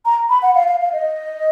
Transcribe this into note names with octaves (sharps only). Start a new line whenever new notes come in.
A#5
B5
F#5
F5
F5
F5
D#5